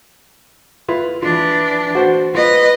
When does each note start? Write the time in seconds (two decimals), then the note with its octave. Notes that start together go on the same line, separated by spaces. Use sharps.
0.88 E4 F4 B4
1.22 E3 D4 F4
1.95 F#4 C5
2.35 F4 B4 D#5